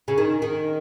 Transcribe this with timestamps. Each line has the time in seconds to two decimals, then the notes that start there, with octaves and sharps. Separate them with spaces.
0.08 C#3
0.18 D#3
0.42 D#3